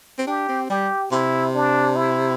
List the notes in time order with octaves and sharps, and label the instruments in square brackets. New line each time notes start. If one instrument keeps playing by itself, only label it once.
[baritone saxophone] C4
[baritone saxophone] D4 [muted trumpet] G4
[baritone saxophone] C4
[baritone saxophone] G3 [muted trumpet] G4
[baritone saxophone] C3 [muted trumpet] E4
[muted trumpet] D4
E4